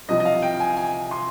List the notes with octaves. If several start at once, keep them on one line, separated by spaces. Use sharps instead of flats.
C2 C3 F3 D#5
D#5
F5
G5
G#5
G#5
C6